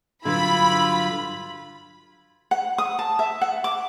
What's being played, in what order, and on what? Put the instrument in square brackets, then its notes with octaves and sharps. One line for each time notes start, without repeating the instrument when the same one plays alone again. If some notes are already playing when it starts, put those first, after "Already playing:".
[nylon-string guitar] G2 D3 F#3 [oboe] E4 [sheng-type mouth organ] F4 [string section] B5
[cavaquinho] F#5
D#6
A5
E5
F#5
D6